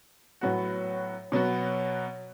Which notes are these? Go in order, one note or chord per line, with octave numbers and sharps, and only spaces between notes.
A2 F#3 B3 F#4
B2 F#3 B3 F#4